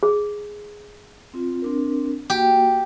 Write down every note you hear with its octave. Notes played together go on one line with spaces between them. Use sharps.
G#4
C4 F4
C4 D4 A#4
A#3 F#4 G4